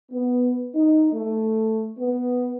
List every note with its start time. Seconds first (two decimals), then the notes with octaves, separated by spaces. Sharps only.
0.12 B3
0.75 D#4
1.12 A3
1.99 B3